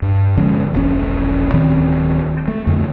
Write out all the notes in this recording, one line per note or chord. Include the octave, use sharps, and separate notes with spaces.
G2
D3 F3 G#3 C#4
E1 A#1 C#4
D1 D#3 C4
A3
F2 D3